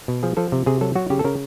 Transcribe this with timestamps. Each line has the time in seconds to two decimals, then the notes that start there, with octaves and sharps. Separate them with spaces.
0.08 B2
0.23 F3 G#4
0.37 F3 A4
0.52 C3
0.66 C3 G#4
0.81 F#3 A4
0.95 F#3 F#4
1.10 C#3 G4
1.19 A4
1.24 C#3 A#4